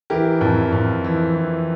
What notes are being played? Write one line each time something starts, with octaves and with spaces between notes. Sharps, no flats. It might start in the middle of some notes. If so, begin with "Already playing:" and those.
E3 G4 A#4
F2
F2
E3
E3